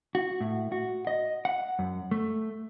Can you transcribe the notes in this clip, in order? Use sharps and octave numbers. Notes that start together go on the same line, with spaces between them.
F#4
A2
F#4
D#5
F#5
F#2
A3